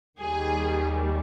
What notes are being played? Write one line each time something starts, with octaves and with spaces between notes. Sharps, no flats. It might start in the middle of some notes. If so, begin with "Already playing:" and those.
D#2 D#3 G3 G#4